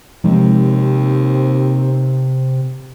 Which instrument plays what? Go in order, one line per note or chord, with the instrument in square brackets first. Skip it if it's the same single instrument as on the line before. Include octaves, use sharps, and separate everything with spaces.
[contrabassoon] D#2 [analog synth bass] C3 [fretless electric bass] F3 G#3 A#3 [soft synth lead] C4